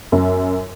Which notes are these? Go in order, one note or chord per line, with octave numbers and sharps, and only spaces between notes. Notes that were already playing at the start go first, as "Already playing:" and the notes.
F#2